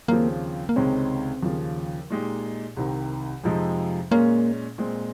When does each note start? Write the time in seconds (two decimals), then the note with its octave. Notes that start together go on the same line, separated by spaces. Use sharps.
0.08 D#2 C#3 F3 A#3 C4
0.69 A#3
0.76 C#2 C3 D#3 G#3 C4 C#4
1.43 D#2 C#3 F3
2.10 A#2 G#3 D#4 G4
2.77 C2 C3 D#3
3.44 F2 C3 F3 G#3 D#4
4.11 A#2 G#3 A#3 C#4 G#4
4.78 A#2 G#3 C4